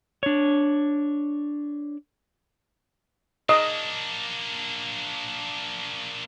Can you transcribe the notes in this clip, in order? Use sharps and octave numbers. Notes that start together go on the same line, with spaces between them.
D4 C#5
A#3 D4 D#5